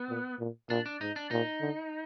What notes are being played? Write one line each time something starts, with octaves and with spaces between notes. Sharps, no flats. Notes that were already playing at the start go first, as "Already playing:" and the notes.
Already playing: B3
A#2
A#2
A#2 D4
D4
G#2 D#4
D4
A#2 D#4
D3